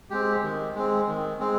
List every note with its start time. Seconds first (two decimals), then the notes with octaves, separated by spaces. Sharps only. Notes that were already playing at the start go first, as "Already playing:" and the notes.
0.10 G#3 C4 G4
0.43 D#3
0.75 G#3 C4
1.07 D#3
1.39 G#3 C4